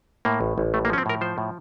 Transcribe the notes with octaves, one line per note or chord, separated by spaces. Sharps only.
A2 A#3
A1
A1
A2 A3
A#3
F3 C#4
C4
A2 A#4
F3 C5
A2